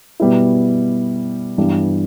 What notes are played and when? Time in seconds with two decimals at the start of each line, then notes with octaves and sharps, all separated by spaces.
0.20 B2 G3 B3 E4
1.58 G2 E3 G3 B3